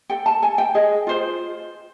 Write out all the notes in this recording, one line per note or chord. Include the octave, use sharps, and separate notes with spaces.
A4 G5
A5
A4 G#5
G5
G#4 D#5
F4 C5